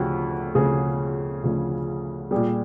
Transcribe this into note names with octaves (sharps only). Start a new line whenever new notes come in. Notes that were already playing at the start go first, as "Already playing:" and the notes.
Already playing: D2 C#3 F3 F#4 G4
D2 C#3 F3 G#4
D2 C#3 F3
A#2 G3 G#4